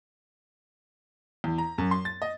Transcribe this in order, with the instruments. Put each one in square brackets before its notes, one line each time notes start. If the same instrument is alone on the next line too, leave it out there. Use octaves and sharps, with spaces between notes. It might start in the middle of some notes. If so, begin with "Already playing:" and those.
[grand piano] E2
A#5
F#2
C6
A6
D#5